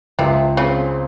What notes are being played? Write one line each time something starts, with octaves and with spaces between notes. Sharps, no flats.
C#2 C3
C#3 C4